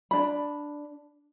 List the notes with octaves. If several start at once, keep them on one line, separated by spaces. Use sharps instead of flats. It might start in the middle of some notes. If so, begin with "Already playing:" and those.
D4 B5